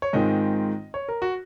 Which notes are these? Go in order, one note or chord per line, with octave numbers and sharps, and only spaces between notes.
C#5
G#2 D#3 G#3 C4 F4 D#5
C#5
A#4
F#4